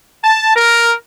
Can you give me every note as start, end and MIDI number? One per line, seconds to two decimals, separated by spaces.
0.24 0.52 81
0.56 0.94 70